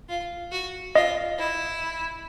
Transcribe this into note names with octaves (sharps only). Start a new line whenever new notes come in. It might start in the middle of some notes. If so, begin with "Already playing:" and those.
F4
F#4
F4 D#5
E4